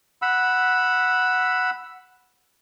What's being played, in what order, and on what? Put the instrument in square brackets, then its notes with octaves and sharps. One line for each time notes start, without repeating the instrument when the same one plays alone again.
[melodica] F#5 B5 E6